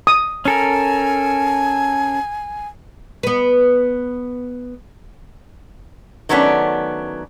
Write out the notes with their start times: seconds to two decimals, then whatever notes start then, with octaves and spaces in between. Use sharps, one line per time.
0.07 D#6
0.45 C#4 A4 A#4 G#5
3.23 B3 B4
6.29 D#3 F#3 A3 B3 C#4 D4